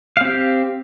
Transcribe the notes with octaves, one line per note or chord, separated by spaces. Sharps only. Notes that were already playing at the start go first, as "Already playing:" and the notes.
C4 G4 F5